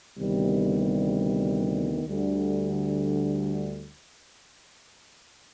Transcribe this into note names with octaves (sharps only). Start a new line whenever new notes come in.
D2 C3 D#3 G3 B3
D2 D3 G3